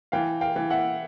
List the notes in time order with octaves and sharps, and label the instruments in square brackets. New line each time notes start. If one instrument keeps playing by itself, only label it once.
[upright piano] E3 [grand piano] F5 G5
[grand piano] F5 G5
[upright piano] E3
[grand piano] E5 F#5